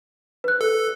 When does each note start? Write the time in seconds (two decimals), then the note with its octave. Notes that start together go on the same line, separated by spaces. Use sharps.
0.44 B4 F#6
0.61 A4